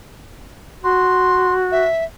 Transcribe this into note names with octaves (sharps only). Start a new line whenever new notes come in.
F#4 C6
E5